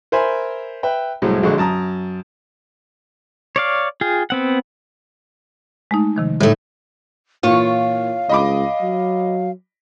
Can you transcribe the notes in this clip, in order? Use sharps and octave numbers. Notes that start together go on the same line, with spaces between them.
A#4 C5 E5 G#5 B5 C6
B4 E5 G5 B5
C2 A2 F#3 G#3
A#1 D3 G#3 F#4 C#6
F#2 A5 A#5 D#6
C#5 D5 F5
F4 G#4 G5
B3 C4 F#5
G#3 A3 D#4
C3 D#3 F3
A2 D3 A3 D#4
A#2 E3 F4 C#5 F5
C#2 D#5 B5 D6
F#3